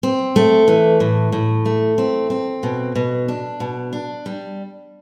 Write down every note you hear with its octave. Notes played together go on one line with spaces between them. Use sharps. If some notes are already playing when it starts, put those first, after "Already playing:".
C4
A3
E3
A2
A2
A3
C4
C4
B2
B2
D4
B2
D4
G3